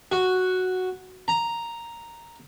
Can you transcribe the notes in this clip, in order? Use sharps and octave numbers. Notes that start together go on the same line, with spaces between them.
F#4
A#5